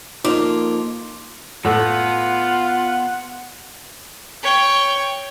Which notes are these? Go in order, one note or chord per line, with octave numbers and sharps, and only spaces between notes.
F2 A#3 D#4 F4 D6
A2 A3 B3 F4 F#5
C#5 G5